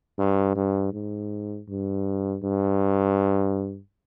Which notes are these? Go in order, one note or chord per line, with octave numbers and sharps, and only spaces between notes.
G2
G2
G#2
G2
G2